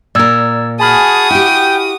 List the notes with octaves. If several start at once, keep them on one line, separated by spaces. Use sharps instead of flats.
A#2 A#4 D5 E6 G#6
F#4 G#4 G#5 A5 B5 D#6 F6
E4 G4 G5